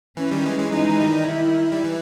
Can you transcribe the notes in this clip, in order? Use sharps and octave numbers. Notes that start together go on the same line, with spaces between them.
E3 C#4
D#3 G3
E3 G#3
E3 G#3
E3 G#3 D#4
E3
D#3 G3
D#3 E4
G3
E3